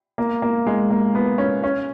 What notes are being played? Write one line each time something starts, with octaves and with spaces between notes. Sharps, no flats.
A#3
A#3
G#3
A#3
B3
C#4
C#4